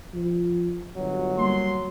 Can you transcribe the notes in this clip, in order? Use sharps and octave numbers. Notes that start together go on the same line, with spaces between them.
F3
G1 F#3
G3 A#3 C6